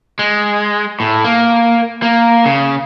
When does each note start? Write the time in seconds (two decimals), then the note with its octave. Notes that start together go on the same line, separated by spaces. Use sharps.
0.19 G#3
1.00 A2
1.24 A#3
2.02 A#3
2.45 C#3